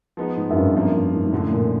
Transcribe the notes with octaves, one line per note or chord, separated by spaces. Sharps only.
F3 G#3 B3 D#4
G#2
F#2
G2
F#2 C3 F3 A#3
F#2
G#2
G#2
F#2 A2 D3 F3
A#2